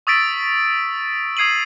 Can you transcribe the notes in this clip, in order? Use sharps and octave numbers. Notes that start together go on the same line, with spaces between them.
C#6 D#6 E6 A6 B6 D7
D#6 G#6 C7 D#7 F#7